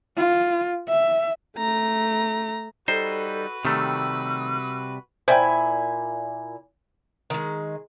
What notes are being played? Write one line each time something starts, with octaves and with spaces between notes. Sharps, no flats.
F4
E5
A3 A#5
G3 D#4 F#4 A4 B4 C5
C3 D#3 G3 A3 E6
A#2 E4 C5 D5 G5 G#5
D#3 G#3